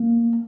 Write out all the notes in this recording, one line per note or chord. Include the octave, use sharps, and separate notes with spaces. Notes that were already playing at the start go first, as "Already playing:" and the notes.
Already playing: A#3